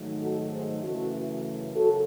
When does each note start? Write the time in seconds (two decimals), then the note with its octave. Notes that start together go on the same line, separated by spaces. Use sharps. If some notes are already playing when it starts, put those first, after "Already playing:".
Already playing: G#2 D#3 F#3 A3
0.21 F#4 A4
0.52 G#4 C5
0.82 F#2 C#3 E3 A3 F#4 A4
1.75 F#2 C#3 F#4 A4